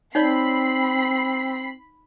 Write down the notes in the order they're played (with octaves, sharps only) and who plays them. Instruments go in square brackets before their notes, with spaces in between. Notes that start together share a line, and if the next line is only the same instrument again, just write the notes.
[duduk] C4 [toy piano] D#4 C#5 D5 [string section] B5 C7